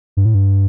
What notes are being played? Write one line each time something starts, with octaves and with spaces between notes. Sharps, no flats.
G2
A2
G2